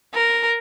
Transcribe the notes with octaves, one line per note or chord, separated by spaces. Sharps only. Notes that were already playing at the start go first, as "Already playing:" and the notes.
A#4